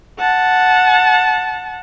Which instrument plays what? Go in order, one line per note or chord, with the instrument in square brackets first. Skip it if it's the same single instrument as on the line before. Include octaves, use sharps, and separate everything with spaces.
[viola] F#5 A5